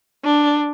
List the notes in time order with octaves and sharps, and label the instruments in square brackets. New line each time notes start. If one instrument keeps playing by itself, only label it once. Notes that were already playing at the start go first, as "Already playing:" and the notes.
[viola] D4